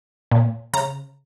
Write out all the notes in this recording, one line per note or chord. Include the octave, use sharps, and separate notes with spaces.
A#2
C#3 A#5